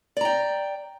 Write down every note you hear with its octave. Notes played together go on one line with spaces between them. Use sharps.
D5 G5 A#5